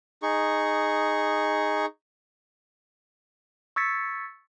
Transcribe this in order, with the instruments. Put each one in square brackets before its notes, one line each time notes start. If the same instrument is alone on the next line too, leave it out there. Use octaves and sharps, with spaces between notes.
[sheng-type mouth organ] D#4 G#4 C#6
[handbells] C#6 E6 G#6 A6 B6 C#7